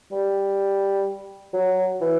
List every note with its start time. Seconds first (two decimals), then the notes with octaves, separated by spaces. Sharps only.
0.11 G3
1.53 F#3
2.01 E3